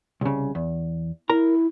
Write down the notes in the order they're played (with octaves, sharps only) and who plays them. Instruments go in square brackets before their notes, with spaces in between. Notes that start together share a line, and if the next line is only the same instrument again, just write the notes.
[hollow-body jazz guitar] C2 C#3
E2
[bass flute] E4 [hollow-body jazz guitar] A#4 A#5